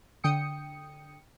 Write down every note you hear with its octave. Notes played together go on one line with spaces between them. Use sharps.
D3 G5 D#6 C#7